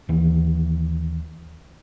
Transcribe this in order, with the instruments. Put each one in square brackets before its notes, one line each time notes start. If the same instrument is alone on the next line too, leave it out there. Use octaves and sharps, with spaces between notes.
[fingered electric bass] D#2 E3